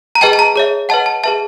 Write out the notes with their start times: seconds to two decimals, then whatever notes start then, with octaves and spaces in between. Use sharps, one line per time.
0.15 A#5
0.21 G#4 B4 D#5 G5 A5
0.33 A5
0.39 A#5
0.56 G#4 C#5 E5
0.89 B4 D#5 F#5 A5
1.06 A5
1.24 G#4 B4 E5 A5